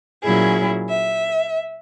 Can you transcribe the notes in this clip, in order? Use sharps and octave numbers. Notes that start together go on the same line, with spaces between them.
A#2 F#3 C#4 E4 G#4
E5